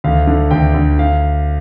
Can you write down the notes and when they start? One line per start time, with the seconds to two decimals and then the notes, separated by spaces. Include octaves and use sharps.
0.04 D2 F5
0.27 D3
0.51 D2 G5
0.74 D2
0.99 F5